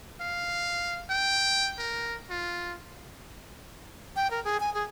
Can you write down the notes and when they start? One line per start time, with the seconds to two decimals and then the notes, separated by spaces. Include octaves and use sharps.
0.20 F5
1.10 G5
1.78 A#4
2.30 F4
4.16 G5
4.31 A#4
4.44 G#4
4.60 G#5
4.74 G#4